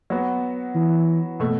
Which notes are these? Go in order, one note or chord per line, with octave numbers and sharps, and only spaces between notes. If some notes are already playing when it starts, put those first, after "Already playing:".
F#3 B3 F#4
E3
B2 A3